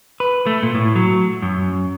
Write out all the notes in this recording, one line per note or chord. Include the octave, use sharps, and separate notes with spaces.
B4
A3
A#2
A2
F#3
F#2